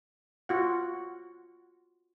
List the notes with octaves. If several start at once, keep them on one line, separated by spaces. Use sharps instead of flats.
F4 F#4 F#5